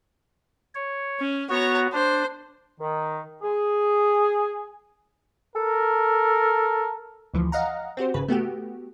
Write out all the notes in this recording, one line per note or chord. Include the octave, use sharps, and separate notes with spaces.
C#5
C#4
B3 F#4 C#5 A#5
D4 C5
D#3
G#4
A4 A#4
D2 E3 F3
D#5 F5 F#5 A#5
C4 F#4 G4 C5
G#1 C#3 B4
A3 B3 F#4 G4